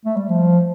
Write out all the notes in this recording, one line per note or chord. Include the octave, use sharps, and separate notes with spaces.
A3
G3
F3